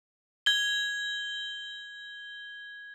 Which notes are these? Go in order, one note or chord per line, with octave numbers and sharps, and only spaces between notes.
G#6 G7